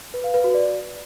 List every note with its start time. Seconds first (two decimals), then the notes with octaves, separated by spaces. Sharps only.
0.14 B4
0.24 F5
0.34 B4
0.44 F#4
0.54 D5